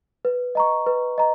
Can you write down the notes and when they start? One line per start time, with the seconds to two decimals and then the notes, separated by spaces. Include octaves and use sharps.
0.25 B4
0.55 D#5 A#5 C#6
0.87 B4
1.18 D#5 A#5